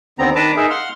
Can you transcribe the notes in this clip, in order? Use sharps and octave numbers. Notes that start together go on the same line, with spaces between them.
D#2 D3 B3 C4 A#5
D#3 D4 B4 A5 A#5 D6
D#4 G#4 A#4 E5
F5 F#5 C6 F6